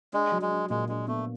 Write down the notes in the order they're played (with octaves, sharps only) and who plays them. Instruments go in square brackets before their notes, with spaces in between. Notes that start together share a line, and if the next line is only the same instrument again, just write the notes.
[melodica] G#3 [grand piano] D4
[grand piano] F#3
[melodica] G#3
[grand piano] D4
[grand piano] A#2 [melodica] G#3
[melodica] G#3 [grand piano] D4
[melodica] A3 [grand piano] B3